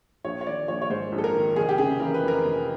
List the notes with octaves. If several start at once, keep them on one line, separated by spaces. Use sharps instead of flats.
A#1 C#5
C#5
D#3 D5
A#1 C#5
C#5
G#2 C5
A#1
A4
A#4
D#3
F1 G#4
G4
C#3 G#4
E3 A#4
B4
F2
A#4
F1